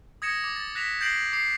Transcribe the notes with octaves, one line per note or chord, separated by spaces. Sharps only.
D#6 G#6 A#6 C#7 E7
D6
A6
F#6 A#6 B6 E7 F7
G6 A6 A#6 C7 D7 F#7
D6 C7